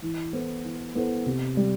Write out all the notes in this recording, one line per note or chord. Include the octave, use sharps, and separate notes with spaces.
E3
B3 E4 A4 C5
E3
B3 E4 A4 C5
C3
G3